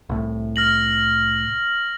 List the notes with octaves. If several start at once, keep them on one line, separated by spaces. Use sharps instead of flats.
C2 A2
F6 A#6 F#7